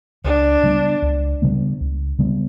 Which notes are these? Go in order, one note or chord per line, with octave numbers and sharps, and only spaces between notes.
C#2 D4
C#3 G3 B3
C#2
C#3 G3 B3
C#2
C#3 G3 B3